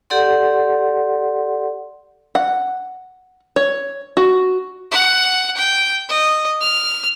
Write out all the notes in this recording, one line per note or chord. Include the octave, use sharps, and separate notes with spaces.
G4 A4 D5 F#5 C6
F#5
C#5
F#4
F#5
G5
D#5
F6